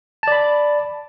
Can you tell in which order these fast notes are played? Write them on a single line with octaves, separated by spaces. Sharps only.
A5 D5 B5